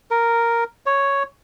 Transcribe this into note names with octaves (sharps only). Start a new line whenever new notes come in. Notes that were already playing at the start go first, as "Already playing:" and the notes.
A#4
C#5